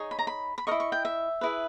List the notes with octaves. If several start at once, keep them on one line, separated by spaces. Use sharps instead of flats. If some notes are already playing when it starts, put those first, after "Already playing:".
Already playing: D#4 G#4 C#5
B5
A#5
B5
B5
E4 A#4 D#5 C#6
C#6
G5
E5
E4 G#4 B4